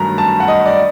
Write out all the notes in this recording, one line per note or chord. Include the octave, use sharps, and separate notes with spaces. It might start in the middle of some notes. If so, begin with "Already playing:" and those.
Already playing: G2 D#3 F#3 A3 A#5
A5
F#5
D#5
D5